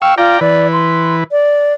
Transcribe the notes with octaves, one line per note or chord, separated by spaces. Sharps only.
F5 G5 C#6 E6
F4 D5 G5 A#5
E3 B4 D5
C6
D5